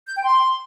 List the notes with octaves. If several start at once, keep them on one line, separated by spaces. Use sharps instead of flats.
G6
G5
C6